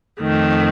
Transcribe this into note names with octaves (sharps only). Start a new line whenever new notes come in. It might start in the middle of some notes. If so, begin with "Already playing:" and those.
F2 D#3 A3